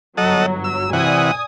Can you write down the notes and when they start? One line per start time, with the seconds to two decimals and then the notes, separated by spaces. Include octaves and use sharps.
0.17 G1 F#3 A4 D#5 F#5
0.64 E6
0.93 C3 E3 D5 F#5 G#5 D#6